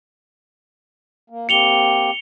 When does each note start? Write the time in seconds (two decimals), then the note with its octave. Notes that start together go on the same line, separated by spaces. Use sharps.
1.30 A#3
1.49 A#3 C4 G4 C#7 F7 G7